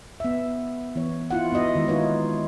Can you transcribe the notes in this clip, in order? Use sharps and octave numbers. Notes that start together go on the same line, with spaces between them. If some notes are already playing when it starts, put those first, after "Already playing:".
B3 E5
E3 B3 C#5
E4 F4 F#5
B3 D#4 F#4 D#5 E5
D#3 G#3 E4
G#3 A#3 D#4 F4 B4 C#5